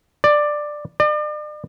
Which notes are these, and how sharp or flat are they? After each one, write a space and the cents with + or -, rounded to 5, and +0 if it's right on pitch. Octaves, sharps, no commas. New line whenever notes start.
D5 +10
D5 +40